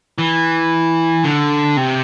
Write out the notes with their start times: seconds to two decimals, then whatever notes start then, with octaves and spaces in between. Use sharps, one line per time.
0.18 E3
1.24 D3
1.77 C3